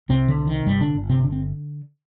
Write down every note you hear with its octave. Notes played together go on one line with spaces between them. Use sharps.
C2 C3 C4
D3
C3
D#3
G1 G2 G3
D3 D4
G1
C3 C4
D3 D4
C4